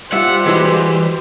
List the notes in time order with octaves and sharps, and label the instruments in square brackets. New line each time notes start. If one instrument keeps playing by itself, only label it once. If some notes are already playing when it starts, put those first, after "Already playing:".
[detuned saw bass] G3 [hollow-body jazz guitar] F4 E5 [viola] G4 C5 [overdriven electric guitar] F#5
[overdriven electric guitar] E3 [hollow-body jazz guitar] G#3 E4 F#4